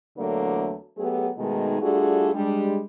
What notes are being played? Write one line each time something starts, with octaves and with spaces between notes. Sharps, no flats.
E2 D3 F#3 A3 A#3 D4
F#3 A3 B3 G4 G#4
B2 D#3 G#3 A3 D#4 G#4
G3 A3 D4 F4 F#4 G#4
G3 G#3 D4